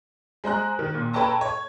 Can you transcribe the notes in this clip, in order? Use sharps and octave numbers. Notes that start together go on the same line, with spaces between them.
G#3 C5 A#5 F#6
D#3
A#2
A4 B4 C#5 G5 A5 A#5
C#5